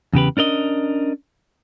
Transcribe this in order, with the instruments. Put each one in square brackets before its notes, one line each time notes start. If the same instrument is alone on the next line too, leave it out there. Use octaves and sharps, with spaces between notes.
[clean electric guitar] E2 C#3 G4 B4
C#4 D4 A#4 D#5